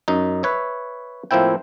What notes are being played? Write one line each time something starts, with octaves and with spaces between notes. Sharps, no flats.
F#2 D#4
B4 C#5 E5
A2 F3 A#3 C4 E4 G5